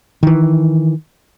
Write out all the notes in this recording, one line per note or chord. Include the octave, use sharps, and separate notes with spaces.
D#3 E3